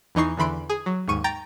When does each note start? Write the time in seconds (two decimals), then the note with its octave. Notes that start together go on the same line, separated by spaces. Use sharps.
0.15 E2 E3 D#4 C#6 C7
0.37 E2 D3 E3 B5 C6 D7
0.70 G#4
0.86 F#3
1.08 D#2 G#2 C#6 D#7
1.24 G5 A#5 A6